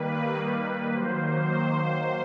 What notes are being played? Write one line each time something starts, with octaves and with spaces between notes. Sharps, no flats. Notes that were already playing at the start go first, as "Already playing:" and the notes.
Already playing: D#3 G3 A#3 B4
B4
D#3 F#3 A#3 C5
C5